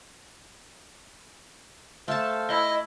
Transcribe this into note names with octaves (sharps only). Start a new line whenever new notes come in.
A3 A4 C5 F5 A5
E4 D#5